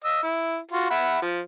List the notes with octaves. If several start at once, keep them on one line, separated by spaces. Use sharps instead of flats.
D#5 E6
E4
F4 F#4
E5 F#5 B5
F3